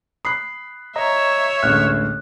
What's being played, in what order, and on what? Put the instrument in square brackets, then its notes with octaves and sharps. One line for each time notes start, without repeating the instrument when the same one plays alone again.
[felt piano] B5 F#6 [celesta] D#6 C7
[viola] C#5 E5 [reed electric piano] D#5 A#5
[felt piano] A1 D2 [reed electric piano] G#3 F6 [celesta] F#6